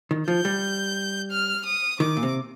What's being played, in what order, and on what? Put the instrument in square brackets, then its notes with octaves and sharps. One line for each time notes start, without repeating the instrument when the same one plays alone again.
[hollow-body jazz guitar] D#3
[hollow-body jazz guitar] F3 [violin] G6
[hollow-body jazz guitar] G3
[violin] F6
D#6
[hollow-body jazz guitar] D#3 [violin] D6
[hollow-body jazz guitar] A#2
C3